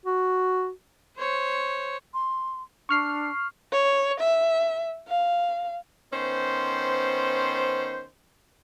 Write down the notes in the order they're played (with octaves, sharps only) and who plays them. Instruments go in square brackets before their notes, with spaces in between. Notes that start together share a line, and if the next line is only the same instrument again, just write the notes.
[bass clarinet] F#4
[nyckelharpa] C5 C#5
[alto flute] C6
[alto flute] D4 [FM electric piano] C#6 F6 C7
[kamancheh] C#5
E5
F5
[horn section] D#3 B3 C#4 C5